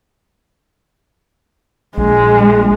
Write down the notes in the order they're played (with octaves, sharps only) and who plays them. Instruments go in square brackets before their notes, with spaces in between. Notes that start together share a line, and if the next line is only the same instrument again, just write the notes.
[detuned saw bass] A#1 [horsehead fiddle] G#3